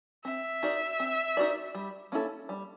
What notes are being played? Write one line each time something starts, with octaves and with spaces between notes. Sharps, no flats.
C4 E5
D#4 F#4 A#4 D5
C4
D#4 F#4 A#4 D5
G3
A#3 C#4 E4 A4
G3